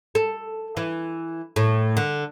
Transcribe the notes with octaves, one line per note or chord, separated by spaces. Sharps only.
A4
E3
A2
D3